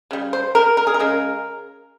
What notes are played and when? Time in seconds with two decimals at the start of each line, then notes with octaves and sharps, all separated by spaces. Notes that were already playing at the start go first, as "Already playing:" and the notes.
0.11 C#3 G3
0.33 C5
0.55 A#4
0.77 A#4
0.87 G#4
0.94 A#4
0.99 C#3 G#3